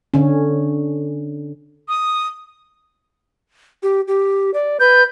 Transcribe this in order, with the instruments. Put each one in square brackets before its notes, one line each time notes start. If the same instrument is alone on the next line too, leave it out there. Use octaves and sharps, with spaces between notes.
[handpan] D3 C#4
[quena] D#6
[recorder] G4
G4
D5
[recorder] B4 [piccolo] G6